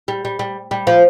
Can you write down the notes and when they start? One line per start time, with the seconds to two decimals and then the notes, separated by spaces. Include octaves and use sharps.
0.08 G3
0.25 G3
0.39 G3
0.71 G3
0.87 F3